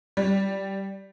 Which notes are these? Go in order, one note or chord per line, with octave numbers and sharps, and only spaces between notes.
G3